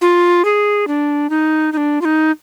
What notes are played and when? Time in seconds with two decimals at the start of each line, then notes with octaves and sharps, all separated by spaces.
0.01 F4
0.45 G#4
0.88 D4
1.30 D#4
1.73 D#4
1.77 D4
2.01 F4
2.05 D#4